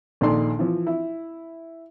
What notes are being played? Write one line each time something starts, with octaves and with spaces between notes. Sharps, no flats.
A#1 A#2 D#3 A4 D5 C6
E3 F3
E4